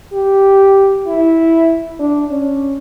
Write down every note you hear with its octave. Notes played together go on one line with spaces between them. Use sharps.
G4
E4
D4
C#4